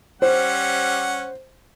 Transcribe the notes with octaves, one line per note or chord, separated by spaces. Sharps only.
G3 C#4 C5 F#5